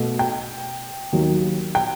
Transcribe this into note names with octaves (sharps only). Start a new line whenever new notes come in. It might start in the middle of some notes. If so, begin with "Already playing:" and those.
Already playing: B2 A3
G5
D#2 D#3 F#3
G5